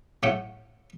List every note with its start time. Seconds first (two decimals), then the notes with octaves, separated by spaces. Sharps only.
0.23 A2 A3 F#5 G5